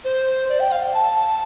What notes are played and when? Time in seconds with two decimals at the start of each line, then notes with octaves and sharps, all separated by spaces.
0.05 C5
0.49 D5
0.60 G5
0.72 F5
0.83 G5
0.94 A5